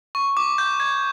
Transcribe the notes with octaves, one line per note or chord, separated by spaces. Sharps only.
C#6
D6
G6
G#6